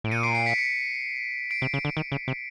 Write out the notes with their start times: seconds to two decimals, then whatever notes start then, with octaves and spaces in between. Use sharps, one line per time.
0.04 A2 D7
0.12 A#2 C#7 D#7
0.23 C7 D7
0.35 C7 D7
0.46 B6 C#7
0.58 B6 C#7
1.51 C7 D7
1.62 C3
1.74 C#3
1.85 D3
1.97 D#3
2.12 C#3
2.28 C3